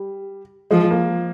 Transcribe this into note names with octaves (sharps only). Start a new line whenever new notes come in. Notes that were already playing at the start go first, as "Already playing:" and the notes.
Already playing: G3
F3 G#3
A#3